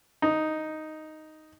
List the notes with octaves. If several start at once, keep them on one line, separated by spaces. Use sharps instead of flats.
D#4